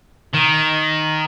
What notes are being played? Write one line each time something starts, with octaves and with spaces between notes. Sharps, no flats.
D#3